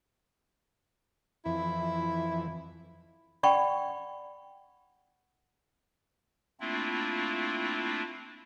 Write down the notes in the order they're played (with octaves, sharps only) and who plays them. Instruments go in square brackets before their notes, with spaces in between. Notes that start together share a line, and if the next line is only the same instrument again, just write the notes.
[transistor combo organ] F2 E3 [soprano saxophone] E4
[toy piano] D5 F#5 G5 B5 C#6
[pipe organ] A3 A#3 C4 D4 E4 F4